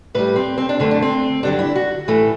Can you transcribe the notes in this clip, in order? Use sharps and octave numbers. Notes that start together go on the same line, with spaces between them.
A2 G3 B4
C4
C4
D4
F#2 D3 A3 C4
D4
C4
G2 D3 F#3 D4
E4
F#4
A2 E3 A3